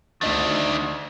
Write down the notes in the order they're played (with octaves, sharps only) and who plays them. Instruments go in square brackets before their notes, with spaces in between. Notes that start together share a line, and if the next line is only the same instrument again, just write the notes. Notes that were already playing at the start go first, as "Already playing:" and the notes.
[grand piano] D2 D#5 A6 [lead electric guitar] D#3 D4